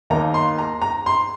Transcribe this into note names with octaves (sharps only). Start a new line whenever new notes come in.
D#2 D#3 A#3 D#4 A#5
C6
A#5
A#5
C6